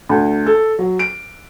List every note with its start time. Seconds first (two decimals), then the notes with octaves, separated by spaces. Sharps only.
0.09 D2
0.46 A4
0.79 F#3
0.99 D7